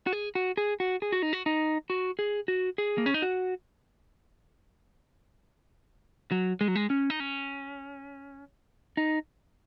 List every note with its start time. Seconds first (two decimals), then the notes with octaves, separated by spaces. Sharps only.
0.07 F#4
0.13 G#4
0.35 F#4
0.57 G#4
0.80 F#4
1.02 G#4
1.12 F#4
1.22 D#4
1.33 F#4
1.46 D#4
1.90 F#4
2.19 G#4
2.48 F#4
2.78 G#4
2.98 A#3
3.06 C#4
3.14 D#4
3.22 F#4
6.32 F#3
6.61 G#3
6.68 F#3
6.75 G#3
6.90 C#4
7.10 D#4
7.20 C#4
8.97 D#4